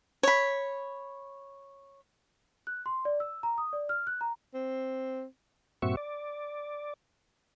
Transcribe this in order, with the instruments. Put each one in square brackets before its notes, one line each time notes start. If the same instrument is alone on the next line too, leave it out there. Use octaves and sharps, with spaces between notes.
[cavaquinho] C#5 B5
[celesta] F#6
C6
D5
E6
A#5
D#6
D5
F6
F#6
A#5
[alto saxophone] C4
[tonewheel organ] G2 A#2 C4 F#4 E5 C#6
D5